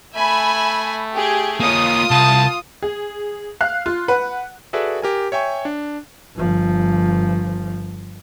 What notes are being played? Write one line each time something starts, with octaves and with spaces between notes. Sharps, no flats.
A3 E5 G#5 B5
G4 G#4
A#3 F4 C#5 D#6
C2 A5
G#4
F5 F#6
F4
B4 F#5
F#4 G#4 A4 B4 D5 E5
G4 A#4 G#5
C#5 E5 G5 G#5 C#6
D4
G1 F3